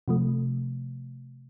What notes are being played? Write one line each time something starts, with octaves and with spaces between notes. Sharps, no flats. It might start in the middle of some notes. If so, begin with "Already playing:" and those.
C3 F3 A3